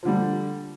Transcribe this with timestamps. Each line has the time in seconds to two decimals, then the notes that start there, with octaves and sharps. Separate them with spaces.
0.03 F3
0.05 D3
0.08 G3